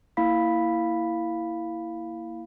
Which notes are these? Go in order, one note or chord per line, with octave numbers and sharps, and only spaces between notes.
A#3 E4 F5 B5 B6